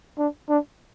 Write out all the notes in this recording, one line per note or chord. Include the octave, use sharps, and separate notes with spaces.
D4
D4